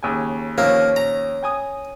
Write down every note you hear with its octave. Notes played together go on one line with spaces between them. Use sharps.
D#2 C#3 G#5
D#2 F3 A#3 C#5
A#5
G5 G#5 D#6